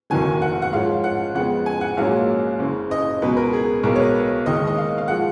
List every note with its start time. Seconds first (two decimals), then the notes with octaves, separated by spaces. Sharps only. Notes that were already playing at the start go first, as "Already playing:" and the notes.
0.10 F1 D#2 D#3 F#3 G#5
0.42 F#5
0.62 F#5
0.72 G#2 F3 G#3 C#4 F5
1.04 F#5
1.35 F2 C#3 G#3 B3 F#5
1.66 G#5
1.81 F#5
1.97 A#1 G#2 F#3 A#3 C#4 F5
2.59 F#1 F#2 C#3
2.91 D#5
3.22 C#2 B2 F#3 B4
3.37 A#4
3.53 G#4
3.83 B1 B2 G#3 A#4
3.96 C#5
4.00 B4
4.46 D#2 D#3 G#3 D#5
4.67 D#5
4.78 F5
4.98 F5
5.08 F3 G#3 F#5